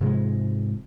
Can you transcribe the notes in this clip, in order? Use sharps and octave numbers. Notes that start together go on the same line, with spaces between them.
G#2 C3 F3 G#3